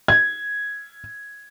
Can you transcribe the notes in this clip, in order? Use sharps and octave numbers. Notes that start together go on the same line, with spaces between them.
G#6